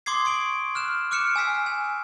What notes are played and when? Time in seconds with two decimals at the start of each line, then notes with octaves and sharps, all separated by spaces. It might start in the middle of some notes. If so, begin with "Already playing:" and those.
0.06 C6 D6 D#6 G#6 C7
0.25 C#6 C7 D7 F#7
0.75 F6 F#6 E7
1.11 D6 F6 F#6 C#7 D7 E7
1.36 G#5 E6 B6 C7
1.66 G#5